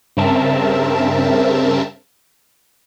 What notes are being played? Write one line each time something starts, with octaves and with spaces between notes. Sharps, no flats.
G2 C#3 C4 A#4 E5 A5